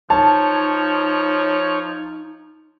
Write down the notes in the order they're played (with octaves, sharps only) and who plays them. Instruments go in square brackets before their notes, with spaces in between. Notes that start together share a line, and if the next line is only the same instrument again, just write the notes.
[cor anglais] F3 [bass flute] D#4 [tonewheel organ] C#5 [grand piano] A5